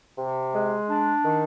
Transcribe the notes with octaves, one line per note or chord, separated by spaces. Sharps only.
C3
G#3
D4
D#3